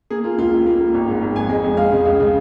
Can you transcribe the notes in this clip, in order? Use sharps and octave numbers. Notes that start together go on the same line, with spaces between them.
A#3 G#4
A#3 F4
C#2 F4
D#2
A#3
A#3
G#1
G#2
G#1
F2 G#5
G#3
F2
G#3 F5
C#3
C#2
C#3